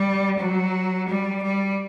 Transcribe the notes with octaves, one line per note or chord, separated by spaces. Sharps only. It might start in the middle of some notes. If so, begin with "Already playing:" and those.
Already playing: G3
F#3
G3
G3